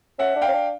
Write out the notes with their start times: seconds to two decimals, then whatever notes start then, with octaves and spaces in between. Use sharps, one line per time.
0.19 C#4 E5 F#5
0.36 D4
0.42 F5 G5
0.49 C#4
0.54 D4